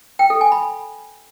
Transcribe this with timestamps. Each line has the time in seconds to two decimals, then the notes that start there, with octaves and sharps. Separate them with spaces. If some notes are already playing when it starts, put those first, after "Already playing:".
0.19 G5
0.30 A4
0.41 G#5
0.52 B5